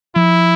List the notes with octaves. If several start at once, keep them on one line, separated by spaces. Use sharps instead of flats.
F3 E4